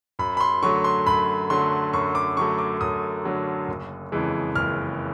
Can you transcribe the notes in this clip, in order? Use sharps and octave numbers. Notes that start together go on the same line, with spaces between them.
F#2 B5
B5
C6
D3 F#3 A3 C#6
C6
F#2 B5
D3 F#3 A3 C6
F#2 C#6
D6
D3 F#3 A3 C#6
D6
F#2 D#6
D3 F#3 A3
F#1
F2 C#3 E3 G#3
F#1 F6